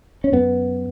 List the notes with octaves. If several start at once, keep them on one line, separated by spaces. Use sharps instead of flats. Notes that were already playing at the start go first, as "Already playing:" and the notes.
C#4
F#2 B3